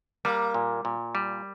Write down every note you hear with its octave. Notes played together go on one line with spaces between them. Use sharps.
G3 A#3
A#2
A#2
G3